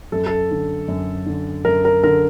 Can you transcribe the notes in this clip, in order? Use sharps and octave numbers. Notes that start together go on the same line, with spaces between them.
F#2 A4
A4
D3
F#2
D3
F#2 A#4
A#4
D3 A#4